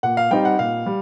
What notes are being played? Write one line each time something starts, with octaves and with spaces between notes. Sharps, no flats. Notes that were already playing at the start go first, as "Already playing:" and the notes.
A#2 F#5
F5
G3 C4 D#4 G5
F#5
A#2 F5
G3